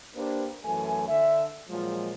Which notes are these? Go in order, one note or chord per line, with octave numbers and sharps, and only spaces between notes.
A#3 D4 G4 B4 C5
F#2 E3 A3 G#5
D3 E5
A#2 F3 F#3 G#3